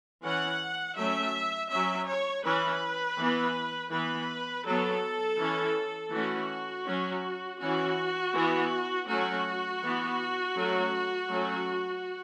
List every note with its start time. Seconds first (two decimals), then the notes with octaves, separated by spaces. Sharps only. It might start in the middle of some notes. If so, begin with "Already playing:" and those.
0.23 E3 C#4 F#5
0.96 F#3 A3 C#4 E5
1.70 F#3 C#4 E5
2.07 C#5
2.44 E3 C#4 B4
3.18 E3 B3
3.91 E3 B3 B4
4.65 F#3 B3 A4
5.39 E3 C#4
6.13 E3 A3 C#4 F#4
6.87 F#3 C#4
7.60 E3 C#4 F#4
8.34 E3 B3
9.08 F#3 A3 C#4 F#4
9.82 E3 B3
10.56 F#3 A3 C#4
11.29 F#3 A3 C#4